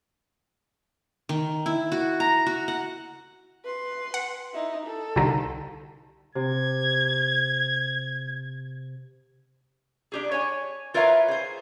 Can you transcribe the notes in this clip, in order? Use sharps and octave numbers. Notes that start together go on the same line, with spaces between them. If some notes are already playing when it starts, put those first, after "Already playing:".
D#3
E4
F#4
A#5
F#4
F#5
B4 C6
F#5
D#4 E4
A4
C2 D3 D#3
C3 G#6
D4 G4 G#4
C#5 G#5
F4 A#4 B4 C#5 E5 F5
G#4 C5